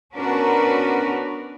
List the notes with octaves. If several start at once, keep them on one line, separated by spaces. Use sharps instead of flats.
B3 C#4 D4 F#4 A#4 B4